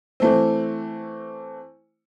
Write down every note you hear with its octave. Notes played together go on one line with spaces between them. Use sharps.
E3 A3 C4